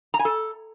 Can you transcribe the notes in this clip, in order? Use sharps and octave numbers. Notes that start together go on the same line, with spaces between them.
A#5
G#5
A4